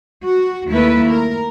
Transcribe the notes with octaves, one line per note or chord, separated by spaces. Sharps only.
F#4
D#2 A3 A#3 E4 B4
A#4